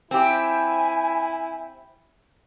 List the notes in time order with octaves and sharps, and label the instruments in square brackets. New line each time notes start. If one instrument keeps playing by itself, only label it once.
[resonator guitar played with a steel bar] C4 G4 [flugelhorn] E4 [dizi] G#5